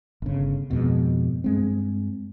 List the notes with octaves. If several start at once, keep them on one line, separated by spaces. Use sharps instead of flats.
G1 C#3
F2 G#2 B2
G2 G#3 C4